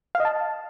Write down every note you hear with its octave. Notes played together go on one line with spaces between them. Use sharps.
F5
D#5
A5